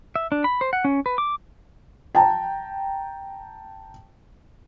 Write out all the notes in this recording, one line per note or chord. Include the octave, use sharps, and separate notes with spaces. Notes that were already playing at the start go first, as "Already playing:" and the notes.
E5
D4
B5
C5
F#5
C#4
B4
D6
G5 A5 A#5